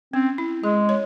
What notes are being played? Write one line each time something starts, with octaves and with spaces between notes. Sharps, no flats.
C4 C#4
E4
G#3 G#4
C#5